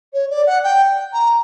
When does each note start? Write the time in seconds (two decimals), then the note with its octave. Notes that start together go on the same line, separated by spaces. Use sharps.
0.13 C#5
0.30 D5
0.46 F#5
0.63 G5
1.13 A#5